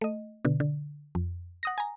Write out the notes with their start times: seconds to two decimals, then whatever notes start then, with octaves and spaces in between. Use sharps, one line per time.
0.01 A3 D#5
0.45 B2 D3
0.60 D3
1.15 F2
1.63 F#5 D#6 A#6
1.78 G#5 A#5